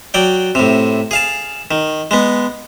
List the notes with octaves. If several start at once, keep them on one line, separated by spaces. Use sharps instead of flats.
F#3 D5 G5
A2 C3
G#4 F5 A5
D#3
G#3 B3